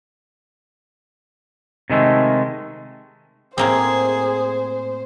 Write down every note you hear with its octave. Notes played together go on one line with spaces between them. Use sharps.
C3 D#3 G#3 A3
A2 A#3 C4 G#4 C5